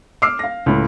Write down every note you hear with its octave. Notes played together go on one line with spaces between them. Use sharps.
D6 E6 F6 C7
F5 A#6
C#2 A2